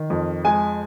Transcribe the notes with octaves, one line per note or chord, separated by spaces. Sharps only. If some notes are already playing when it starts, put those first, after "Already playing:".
Already playing: D#3
F2
G#3 G#5